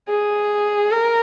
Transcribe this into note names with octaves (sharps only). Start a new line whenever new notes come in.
G#4
A#4